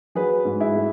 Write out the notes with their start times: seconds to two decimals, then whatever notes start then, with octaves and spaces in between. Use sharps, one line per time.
0.15 F#3 G#4 B4
0.45 G#2
0.60 E4 G#4
0.75 A3